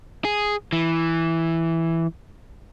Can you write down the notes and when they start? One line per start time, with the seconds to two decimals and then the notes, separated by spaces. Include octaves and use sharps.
0.25 G#4
0.72 E3